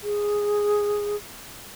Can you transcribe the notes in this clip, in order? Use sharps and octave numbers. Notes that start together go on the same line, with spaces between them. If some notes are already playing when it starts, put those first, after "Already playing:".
G#4